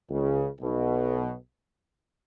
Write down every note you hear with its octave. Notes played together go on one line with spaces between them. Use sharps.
C#2 C#3
B1 B2